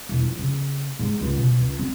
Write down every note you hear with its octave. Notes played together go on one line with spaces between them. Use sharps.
E1
F3
C#3
G#2
C#2
B2
C#2
C4